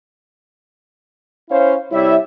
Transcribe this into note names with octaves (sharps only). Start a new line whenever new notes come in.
C#4 E4 C5 C#5 F5
C3 G3 E4 C#5 E5